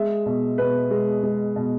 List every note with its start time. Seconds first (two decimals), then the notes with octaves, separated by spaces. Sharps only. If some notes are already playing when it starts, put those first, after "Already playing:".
Already playing: G#3 E5
0.26 B2
0.58 B2 B4
0.91 G#3
1.23 G#3
1.56 B2